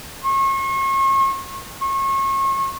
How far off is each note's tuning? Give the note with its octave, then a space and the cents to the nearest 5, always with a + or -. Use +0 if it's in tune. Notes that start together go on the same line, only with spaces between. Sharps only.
C#6 -40
C#6 -35